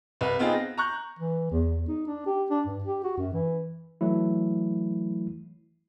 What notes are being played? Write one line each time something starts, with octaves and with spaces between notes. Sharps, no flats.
C2 B4
B3 C4 D#4 F4 G#4
A#6
A#5 C#6 F#6 G6
E3
E2
D#4
D4
G4
D4
G2
G4
F#4
F#2
E3
E3 F#3 A3 E4